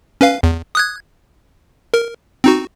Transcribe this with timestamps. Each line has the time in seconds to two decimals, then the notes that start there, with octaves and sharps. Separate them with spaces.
0.21 C#4 B4 F5
0.43 E2
0.75 D#6 F#6 G#6
1.94 A#4
2.44 C4 D#4 F#4